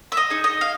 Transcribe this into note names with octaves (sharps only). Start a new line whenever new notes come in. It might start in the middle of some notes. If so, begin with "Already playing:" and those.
E5
D#5
D#4 G#4
D#5
F5